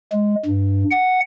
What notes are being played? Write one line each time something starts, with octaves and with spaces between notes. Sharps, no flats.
G#3
G2
F#5